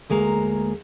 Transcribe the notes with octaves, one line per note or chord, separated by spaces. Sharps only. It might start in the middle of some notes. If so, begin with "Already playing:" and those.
D2 G#3 A#3 A#5